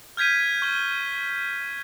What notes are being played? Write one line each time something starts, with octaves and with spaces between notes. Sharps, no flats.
F6 G6 G#6 B6 D#7
C#6 G7